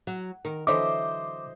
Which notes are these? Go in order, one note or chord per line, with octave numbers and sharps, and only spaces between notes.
F#3
D#3 A#4
D3 E3 F#3 C5 D#5 E5 D6